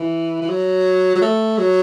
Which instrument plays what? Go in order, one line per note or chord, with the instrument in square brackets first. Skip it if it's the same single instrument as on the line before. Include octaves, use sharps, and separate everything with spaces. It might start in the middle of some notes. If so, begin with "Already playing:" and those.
Already playing: [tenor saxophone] E3
E3
F#3
F#3
A3
F#3